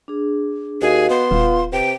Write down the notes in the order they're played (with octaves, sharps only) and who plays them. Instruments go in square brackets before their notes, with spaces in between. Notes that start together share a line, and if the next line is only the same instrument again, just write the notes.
[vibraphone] D4 G#4
[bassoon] D#2 [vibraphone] F#4 D#5 F5 [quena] G#4
[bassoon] B3 [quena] C6
[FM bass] D#1 [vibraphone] F4 F5
[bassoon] C3 [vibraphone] B4 [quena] G5